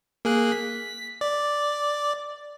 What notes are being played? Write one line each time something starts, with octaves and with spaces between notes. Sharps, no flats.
A#3 G#4 F#6
B6
D5